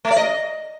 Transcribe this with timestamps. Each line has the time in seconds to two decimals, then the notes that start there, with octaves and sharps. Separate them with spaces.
0.05 A3
0.11 D5
0.17 D#5